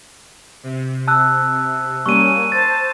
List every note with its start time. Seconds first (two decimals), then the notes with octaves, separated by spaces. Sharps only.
0.63 C3
1.08 A5 E6 F#6
2.06 G3 A#3 C#4 C#6 D#7
2.52 C5 A5 A6